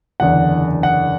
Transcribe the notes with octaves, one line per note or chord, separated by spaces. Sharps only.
F#1 E2 D3 F#5
F#5